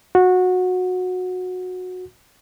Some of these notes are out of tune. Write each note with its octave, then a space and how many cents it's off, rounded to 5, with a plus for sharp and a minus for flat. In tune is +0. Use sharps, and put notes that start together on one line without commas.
F#4 -15